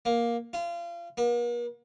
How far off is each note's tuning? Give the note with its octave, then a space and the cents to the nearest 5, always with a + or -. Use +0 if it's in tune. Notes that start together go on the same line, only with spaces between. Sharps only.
A#3 +10
F4 -30
A#3 +45